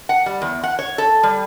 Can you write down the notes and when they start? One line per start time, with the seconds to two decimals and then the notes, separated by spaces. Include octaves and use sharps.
0.09 F#5
0.26 G3
0.42 E2
0.63 F#5
0.79 C#5
0.98 A4
1.23 G3